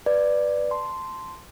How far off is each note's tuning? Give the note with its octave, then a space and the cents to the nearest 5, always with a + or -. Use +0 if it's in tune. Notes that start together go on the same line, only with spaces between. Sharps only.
B4 +0 D5 +5
A5 +0 C6 -5